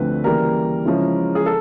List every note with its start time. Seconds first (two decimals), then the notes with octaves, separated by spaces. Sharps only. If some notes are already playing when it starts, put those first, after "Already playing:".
Already playing: D2 D3 F3 A3 C4 B4
0.24 C#3 E3 G3 A#3 A#4
0.85 C#3 F3 G#3 C#4 E4
1.35 G#4
1.46 A4